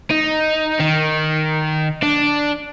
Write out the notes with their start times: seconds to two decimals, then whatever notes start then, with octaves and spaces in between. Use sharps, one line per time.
0.11 D#4
0.80 D#3
2.02 D4